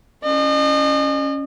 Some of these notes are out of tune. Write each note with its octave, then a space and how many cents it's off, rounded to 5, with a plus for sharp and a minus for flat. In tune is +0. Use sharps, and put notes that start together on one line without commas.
C#4 +0 D#5 -40